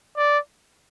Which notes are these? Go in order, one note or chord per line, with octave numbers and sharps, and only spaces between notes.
D5